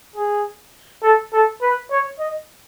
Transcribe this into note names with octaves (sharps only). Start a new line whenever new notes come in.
G#4
A4
A4
B4
C#5
D#5